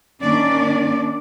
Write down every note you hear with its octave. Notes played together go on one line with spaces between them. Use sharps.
D#3 A#3 C#4 D4 D5